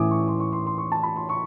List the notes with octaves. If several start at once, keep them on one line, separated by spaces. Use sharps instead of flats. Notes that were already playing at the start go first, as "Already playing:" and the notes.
Already playing: A2 E3 A3 C#4 E4 G#5 D6 D#6
C#6
C6
C#6
C6
C6
C#6
A5
B5
C6
C#6